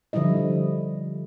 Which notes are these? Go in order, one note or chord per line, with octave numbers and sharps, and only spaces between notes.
D3 F3 G3 E4 D#5